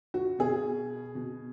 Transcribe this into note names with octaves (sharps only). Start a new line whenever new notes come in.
F#4
B2 G#4
B2